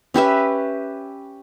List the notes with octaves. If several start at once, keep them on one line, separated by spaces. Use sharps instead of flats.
C#4 G4 B4 E5